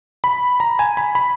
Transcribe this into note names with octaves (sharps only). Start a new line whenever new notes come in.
B5
A#5
G#5
B5
B5